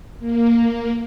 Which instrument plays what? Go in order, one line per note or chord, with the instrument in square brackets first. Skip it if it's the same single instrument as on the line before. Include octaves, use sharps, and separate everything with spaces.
[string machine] A#3